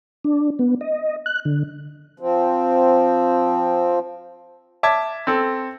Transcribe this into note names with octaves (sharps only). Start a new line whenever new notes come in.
D4
B3
D#5
F#6
D3
F3 C4
E5 A5 D6 G#6
C4 A4